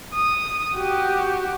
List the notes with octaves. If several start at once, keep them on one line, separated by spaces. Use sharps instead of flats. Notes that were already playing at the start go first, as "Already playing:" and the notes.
D#6
F#4 G4